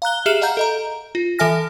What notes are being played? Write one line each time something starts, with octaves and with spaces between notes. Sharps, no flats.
F5 A#5 F#6 G7
G4 G#4 E5 F6 E7 F#7
D#5 F5 F#5 A#5 G6
A4 D#5 A#5
F4
E3 A4 E5 G#5 F6 A#6